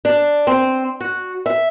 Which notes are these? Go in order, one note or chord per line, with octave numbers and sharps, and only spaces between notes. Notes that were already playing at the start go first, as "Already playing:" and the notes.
D4
C4
F#4
E5